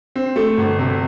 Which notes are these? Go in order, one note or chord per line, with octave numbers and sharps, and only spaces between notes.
C4
A3
G1
C3